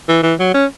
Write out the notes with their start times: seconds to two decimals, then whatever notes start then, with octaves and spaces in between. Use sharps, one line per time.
0.08 E3
0.23 E3
0.39 F#3
0.54 C#4